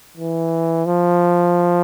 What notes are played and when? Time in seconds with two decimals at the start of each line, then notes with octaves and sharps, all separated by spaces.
0.17 E3
0.85 F3